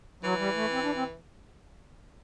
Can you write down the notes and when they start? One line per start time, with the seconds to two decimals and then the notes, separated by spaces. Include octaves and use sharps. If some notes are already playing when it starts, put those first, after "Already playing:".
0.23 E3 F#3
0.38 G3
0.55 A3
0.71 C4
0.83 D4
0.95 C4